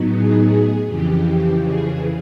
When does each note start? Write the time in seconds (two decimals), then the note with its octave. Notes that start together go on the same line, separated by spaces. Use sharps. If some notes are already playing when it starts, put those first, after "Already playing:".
Already playing: A2 F#3 B3 D#4
0.09 G#4
0.86 F2 C#3 E3 G4
1.24 G4
1.62 G#4